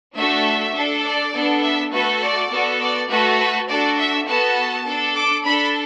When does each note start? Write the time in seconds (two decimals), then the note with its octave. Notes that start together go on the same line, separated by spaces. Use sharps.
0.15 A3 D4 F#4 A4 E5
0.74 D4 A4
1.04 D5
1.34 B3 D4 A4
1.62 E5
1.91 A3 F#4 A4 B4
2.21 D5
2.51 B3 F#4 A4
2.80 D5
3.09 A3 F#4 A4 B4
3.38 B4
3.68 D4 F#4 A4 D5
3.98 E5
4.27 B3 F#4 A4 A5
4.85 D4 A4
5.16 D6
5.44 D4 A4 B5